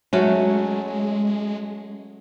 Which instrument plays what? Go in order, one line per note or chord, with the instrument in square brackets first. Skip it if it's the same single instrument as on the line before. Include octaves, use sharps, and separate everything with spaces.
[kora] F#3 A3 C#4 [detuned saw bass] G#3